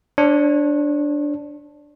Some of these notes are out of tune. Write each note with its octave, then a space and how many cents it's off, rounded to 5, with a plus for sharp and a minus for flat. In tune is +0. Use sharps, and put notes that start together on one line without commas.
D4 +0 C#5 -40